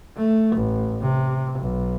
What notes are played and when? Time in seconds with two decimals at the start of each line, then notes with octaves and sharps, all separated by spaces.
0.17 A3
0.56 A1
1.01 C3
1.59 B1